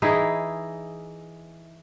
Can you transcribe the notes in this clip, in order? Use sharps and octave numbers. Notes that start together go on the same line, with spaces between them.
E3 D#4 E4 G#4